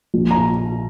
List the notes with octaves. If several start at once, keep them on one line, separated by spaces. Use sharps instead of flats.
A#1 A#2
A#5